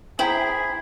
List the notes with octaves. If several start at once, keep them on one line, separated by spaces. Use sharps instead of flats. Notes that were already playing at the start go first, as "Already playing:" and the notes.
E4 G#4 C5 G5 A#5 B6 F#7